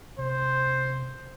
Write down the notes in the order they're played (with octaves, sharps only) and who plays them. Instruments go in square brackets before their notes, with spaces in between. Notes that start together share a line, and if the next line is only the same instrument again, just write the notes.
[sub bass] C3 [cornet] C5